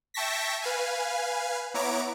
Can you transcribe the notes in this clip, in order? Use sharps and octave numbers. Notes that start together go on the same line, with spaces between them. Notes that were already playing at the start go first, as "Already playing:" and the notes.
E5 G5 A5 C#6 A#6 B6
B4 F5 G#5
B3 E4 C#5 A#5 D6 D7